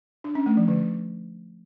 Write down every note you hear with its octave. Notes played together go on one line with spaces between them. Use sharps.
D4
C#4
A3
F3
D3